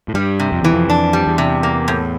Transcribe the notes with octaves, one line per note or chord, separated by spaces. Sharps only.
A2
G2 G3
C3
F2
E2 E3
F2
F2 D4
G3
E2
C3
A#3
A2